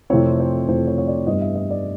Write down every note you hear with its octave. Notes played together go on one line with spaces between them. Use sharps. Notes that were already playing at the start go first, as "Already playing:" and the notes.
F2 C3 E3 A3 C4 C#5
C5
F2 C3 E3 A3 C4 C5
C#5
C#5
D5
G2 E3 G3 B3 D#5
E5
D#5
D5